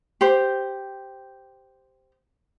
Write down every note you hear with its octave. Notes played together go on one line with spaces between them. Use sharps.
G4 C5